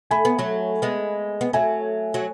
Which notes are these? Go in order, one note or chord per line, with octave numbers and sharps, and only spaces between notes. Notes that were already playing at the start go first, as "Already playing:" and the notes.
A3 G#5 B5
B3
F#3 A3
G#3 B3
B3
F#3 A3 E5 G#5
F#3